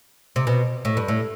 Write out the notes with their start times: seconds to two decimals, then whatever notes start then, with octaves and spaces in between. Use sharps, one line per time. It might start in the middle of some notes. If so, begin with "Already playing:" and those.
0.36 C3
0.47 B2
0.85 A2
0.97 G2
1.08 A2